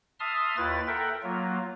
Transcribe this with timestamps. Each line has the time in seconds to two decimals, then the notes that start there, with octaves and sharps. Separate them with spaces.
0.20 E5 A5 C6 D#6 F6
0.57 D#2 E4 F4 B4 A6
0.87 A4 A#4 E5 F#5 G5
1.23 F#3 A#3 F4